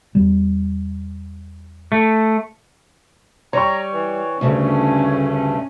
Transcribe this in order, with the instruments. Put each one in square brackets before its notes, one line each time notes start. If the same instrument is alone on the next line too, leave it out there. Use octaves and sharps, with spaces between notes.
[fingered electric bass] E2 G3
[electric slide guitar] A3
[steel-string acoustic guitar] G3 [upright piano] C#5 G5 C#6 [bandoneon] A#5
[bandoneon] E3
[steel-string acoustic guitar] D2 C#3 [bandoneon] G2 A3 [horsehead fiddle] C#4